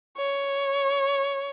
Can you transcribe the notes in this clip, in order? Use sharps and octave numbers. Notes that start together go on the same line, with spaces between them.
C#5